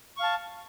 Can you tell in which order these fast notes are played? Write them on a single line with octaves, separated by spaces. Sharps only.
C#6 F5 A5